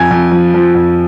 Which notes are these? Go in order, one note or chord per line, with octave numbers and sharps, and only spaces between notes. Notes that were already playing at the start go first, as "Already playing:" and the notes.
Already playing: F2 G#5 G#6
F2
F3
F3
F2